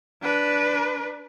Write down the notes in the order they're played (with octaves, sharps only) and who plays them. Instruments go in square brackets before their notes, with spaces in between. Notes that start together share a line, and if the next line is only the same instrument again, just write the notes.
[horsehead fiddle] D4 B4